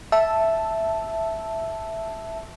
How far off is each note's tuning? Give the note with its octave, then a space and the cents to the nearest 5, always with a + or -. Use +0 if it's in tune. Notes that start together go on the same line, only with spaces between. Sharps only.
E5 +0 A5 +0 E6 +0